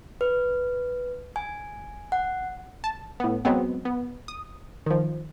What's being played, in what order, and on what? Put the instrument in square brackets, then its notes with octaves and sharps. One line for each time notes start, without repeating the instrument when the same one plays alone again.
[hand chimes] B4
G#5
F#5
[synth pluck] A5
A2 B3
F#3 G#3 B3 C4
B3
D#6
D#3 F3